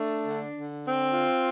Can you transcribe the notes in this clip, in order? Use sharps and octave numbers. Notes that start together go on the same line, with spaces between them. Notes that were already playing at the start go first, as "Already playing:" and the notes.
Already playing: A3 D4
D3
D3
C4
F4